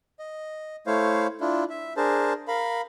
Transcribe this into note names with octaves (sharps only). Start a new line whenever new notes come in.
D#5
A3 E4 C5 C#5 F5
D4 E4 F4
E5
D4 G#4 A#4 C5 A5
A#4 F5 B5